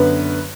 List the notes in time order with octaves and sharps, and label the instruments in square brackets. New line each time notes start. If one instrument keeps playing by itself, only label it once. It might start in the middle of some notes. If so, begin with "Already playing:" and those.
Already playing: [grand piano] F#2 D3 B3 B4